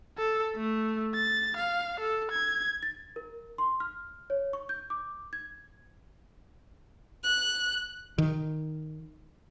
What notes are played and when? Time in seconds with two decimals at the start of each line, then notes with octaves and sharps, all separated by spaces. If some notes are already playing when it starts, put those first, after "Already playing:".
0.18 A4
0.56 A3
1.15 A6
1.57 F5
2.00 A4
2.32 G#6
2.83 A6
3.16 A#4
3.58 C6
3.80 F6
4.30 C#5
4.53 C#6
4.69 G6
4.90 D6
5.33 G#6
7.24 F#6
8.18 D#3